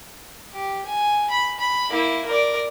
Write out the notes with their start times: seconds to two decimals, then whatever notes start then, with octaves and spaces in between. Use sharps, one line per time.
0.53 G4
0.86 G#5
1.30 B5
1.59 B5
1.90 A#3 E4
2.27 A#4 D5